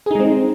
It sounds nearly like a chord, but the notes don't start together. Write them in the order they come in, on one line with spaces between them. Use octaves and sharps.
G#4 D#4 G#3 C4